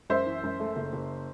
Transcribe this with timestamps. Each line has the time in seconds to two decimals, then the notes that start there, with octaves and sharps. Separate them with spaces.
0.10 F#2 C5 E5
0.26 E3
0.43 F#2
0.60 A3
0.76 F#1
0.93 F#1